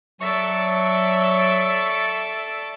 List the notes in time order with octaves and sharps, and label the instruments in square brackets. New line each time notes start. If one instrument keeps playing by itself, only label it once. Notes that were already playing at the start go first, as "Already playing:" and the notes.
[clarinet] F#3 [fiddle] A4 D5 [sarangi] E5 [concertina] C#6